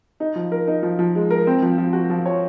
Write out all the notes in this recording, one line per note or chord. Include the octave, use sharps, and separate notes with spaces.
D#4
F3
A#4
D#4
F3
F3
G#3
A#4
C4
F3
F3
F#4
F3
C#5